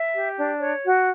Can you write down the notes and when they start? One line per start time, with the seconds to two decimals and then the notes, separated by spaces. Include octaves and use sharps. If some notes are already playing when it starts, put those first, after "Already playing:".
Already playing: E5
0.14 G4
0.37 D4
0.60 C#5
0.84 F#4